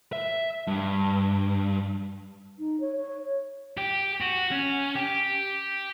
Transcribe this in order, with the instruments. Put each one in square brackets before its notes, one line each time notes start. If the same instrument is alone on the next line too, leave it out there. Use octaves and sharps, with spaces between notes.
[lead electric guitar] E5
G2
[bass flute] D#4
C#5
C#5
[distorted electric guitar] G4
F#4
C#4
G4